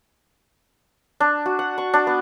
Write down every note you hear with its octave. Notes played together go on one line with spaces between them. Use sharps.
D4
F#4
F#5
C#6
D4
B3